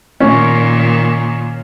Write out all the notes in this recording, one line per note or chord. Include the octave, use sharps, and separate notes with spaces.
A#2 D#3 C#4